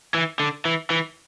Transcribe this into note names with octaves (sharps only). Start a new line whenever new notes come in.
E3
D3
E3
E3